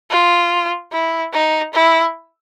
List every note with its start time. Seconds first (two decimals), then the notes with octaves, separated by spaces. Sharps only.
0.11 F4
0.92 E4
1.33 D#4
1.74 E4